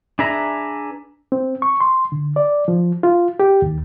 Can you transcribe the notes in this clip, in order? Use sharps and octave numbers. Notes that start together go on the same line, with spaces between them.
D4 G#4 B4 E5 A#5
C4
C#6
C6
D3
D5
F3
F4
G4
D#2